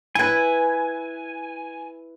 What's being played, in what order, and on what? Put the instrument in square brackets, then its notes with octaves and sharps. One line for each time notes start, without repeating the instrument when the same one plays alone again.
[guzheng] E4 B4 [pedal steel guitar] G#5